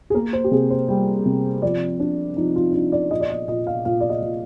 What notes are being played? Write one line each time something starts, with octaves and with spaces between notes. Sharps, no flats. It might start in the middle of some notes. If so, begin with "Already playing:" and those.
G#4
A#3 A#4
C5
G4
C3 G#4
C5
G3
C3
F3 D5
D4
F3 D#4
F4
D#4
D4 F4
D5
A#2 D#5
D5
D#5
A#2 D#5
F5
A#2 F5
D5
D#5
A#2